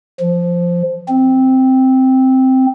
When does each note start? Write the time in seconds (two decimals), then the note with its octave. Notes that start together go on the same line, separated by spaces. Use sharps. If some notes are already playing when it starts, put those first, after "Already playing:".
0.20 F3
1.08 C4